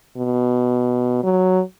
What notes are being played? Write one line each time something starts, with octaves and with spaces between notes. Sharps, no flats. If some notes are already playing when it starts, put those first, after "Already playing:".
B2
F#3